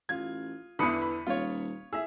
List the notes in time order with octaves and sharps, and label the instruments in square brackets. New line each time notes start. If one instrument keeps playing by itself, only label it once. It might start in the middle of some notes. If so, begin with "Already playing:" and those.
[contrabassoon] A1 [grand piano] F4 G#6
[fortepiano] E2 D3 [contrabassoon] E3 [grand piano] B5 D#6 C#7
[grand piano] B5
[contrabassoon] D#1 [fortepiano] F4 C#5
[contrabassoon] A2 [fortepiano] G#4 [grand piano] E5 E6